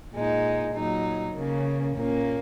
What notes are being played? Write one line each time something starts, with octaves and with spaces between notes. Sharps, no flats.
A#2 G#3 D#4
A#2 F#3 D#4
C#3 A#3 C#4
A#2 A#3 C#4